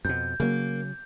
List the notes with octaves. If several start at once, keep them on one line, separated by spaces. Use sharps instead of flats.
F2 B2 G6
C#3 F#3 A#3